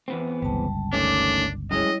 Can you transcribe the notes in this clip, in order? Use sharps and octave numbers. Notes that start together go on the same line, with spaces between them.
E2 B3 C4
G1 C#2 G3 A5
D#3 A3 C#4 D4 D6
F#2 G3 G#3 E4 C#5 D#5